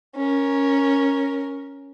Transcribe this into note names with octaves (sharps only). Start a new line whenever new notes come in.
C#4 A#4